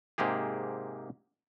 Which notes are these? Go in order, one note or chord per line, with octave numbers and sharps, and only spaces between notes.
G#2 C3 A#3 G4 G#4